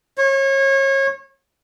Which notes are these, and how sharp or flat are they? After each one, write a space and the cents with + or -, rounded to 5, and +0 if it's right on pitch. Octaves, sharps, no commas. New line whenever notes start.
C#5 -30